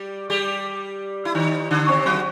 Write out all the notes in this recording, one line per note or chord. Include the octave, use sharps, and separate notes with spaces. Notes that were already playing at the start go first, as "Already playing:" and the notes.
Already playing: G3 G4
G3 G4
E4
D#3 D#4
D3 D4
C3 C4
F#3 F#4